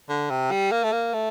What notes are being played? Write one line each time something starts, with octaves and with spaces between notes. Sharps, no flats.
D3
C3
G3
A#3
A3
A#3
A3